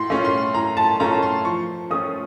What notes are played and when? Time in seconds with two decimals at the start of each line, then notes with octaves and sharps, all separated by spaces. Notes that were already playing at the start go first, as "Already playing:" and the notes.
Already playing: A2 C6
0.10 A3 C#4 F4
0.25 C6
0.54 A2 A#5
0.77 A5
1.00 A3 C#4 F4 A#5
1.22 C6
1.45 F3 C#6
1.91 A3 C#4 F4 D#6